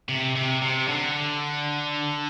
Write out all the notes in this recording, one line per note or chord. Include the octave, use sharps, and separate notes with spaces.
C3
C3
C3
D3